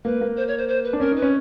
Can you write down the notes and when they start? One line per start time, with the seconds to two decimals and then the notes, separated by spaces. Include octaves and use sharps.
0.05 A#3 B4
0.21 A#3
0.36 C5
0.48 C#5
0.58 C5
0.68 C5
0.84 B4
0.93 D4
1.00 C#4 A#4
1.12 D#4 B4
1.22 C#4